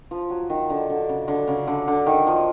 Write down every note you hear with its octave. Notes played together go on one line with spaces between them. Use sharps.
F3
F#3
D#3
D3
D3
C#3
D3
C#3
D3
D3
D#3
F3